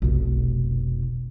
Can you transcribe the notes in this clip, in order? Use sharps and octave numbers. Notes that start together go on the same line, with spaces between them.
F1 B1